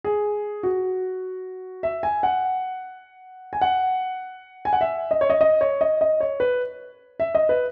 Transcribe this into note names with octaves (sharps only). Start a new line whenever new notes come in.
G#4
F#4
E5
G#5
F#5
G#5
F#5
G#5
F#5
E5
D#5
C#5
D#5
D#5
C#5
D#5
D#5
C#5
B4
E5
D#5
B4